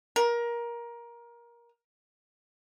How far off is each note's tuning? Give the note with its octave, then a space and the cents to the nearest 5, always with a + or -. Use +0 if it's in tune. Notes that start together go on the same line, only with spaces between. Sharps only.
A#4 +20